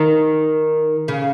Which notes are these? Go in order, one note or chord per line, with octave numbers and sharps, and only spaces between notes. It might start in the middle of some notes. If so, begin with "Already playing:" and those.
Already playing: D#3
C#3